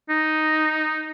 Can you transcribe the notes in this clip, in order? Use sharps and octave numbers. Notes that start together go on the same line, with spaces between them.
D#4